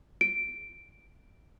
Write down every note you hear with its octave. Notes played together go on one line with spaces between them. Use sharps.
D7